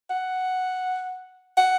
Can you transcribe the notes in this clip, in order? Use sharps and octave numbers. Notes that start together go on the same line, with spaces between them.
F#5
F#5